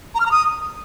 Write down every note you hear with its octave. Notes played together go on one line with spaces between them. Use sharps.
A#5
F6
A#5
D#6